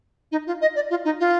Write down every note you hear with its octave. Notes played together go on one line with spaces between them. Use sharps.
D#4
F4
D#5
D5
F4
D#4
F4